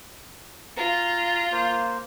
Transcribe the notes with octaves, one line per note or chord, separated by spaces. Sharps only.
F4 A#5
A#3 C5